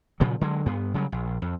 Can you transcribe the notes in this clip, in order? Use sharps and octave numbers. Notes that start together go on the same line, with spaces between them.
A#2 C#3 F3 F#3
D3 F#3 G#3
G2 B3
C#3 F#3 G3
A#1
F2